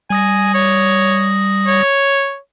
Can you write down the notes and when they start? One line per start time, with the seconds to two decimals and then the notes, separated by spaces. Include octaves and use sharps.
0.10 G3 G#5 D#6 A#6
0.54 C#5
1.67 C#5